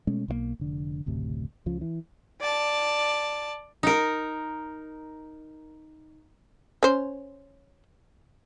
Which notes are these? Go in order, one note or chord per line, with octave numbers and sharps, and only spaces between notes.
B2 G#3 A3 C#4
B1 D#3 A#3
F1 D3
F#1 D2 A2 C3
C#2 C#3 F3
E3
D5 A5
D#4 A#4
C#4 C5